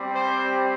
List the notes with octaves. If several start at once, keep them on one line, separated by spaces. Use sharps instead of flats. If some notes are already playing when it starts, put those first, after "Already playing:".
Already playing: G3 C4 G4
C5